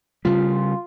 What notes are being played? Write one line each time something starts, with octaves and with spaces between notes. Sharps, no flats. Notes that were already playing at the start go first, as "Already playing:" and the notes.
C#3 G3 F4